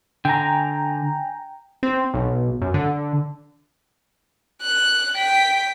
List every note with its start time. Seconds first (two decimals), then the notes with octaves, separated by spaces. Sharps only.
0.25 D3 G5 G#5 A#5
1.83 C4
2.14 B1
2.61 F#2
2.74 D3
4.62 F#6
5.15 G5 B6